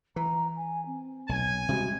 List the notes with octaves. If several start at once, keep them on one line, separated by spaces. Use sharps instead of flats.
E3 A#5
G#5
C4
B1 G#5
C3 G3 G#3 F#4